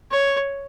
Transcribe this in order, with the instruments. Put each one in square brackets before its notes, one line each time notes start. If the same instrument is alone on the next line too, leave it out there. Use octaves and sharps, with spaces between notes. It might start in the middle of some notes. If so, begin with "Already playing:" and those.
[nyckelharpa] C#5